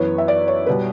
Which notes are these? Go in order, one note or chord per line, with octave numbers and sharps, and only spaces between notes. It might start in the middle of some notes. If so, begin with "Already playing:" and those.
Already playing: F#2 E3 B3 C#5
E5
D5
C#5
B2 G3 B3 B4